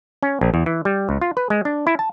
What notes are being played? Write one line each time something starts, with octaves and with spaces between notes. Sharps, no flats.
C#4
A#1
E2
E3
G3
C#2
F4
B4
G#3
D4
E4
A5